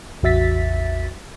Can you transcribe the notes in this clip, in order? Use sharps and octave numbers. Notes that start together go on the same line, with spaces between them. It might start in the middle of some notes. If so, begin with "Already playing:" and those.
A1 E2 F#4 E5 A6 B6